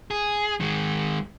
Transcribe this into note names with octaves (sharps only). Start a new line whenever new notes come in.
G#4
D#3 G#3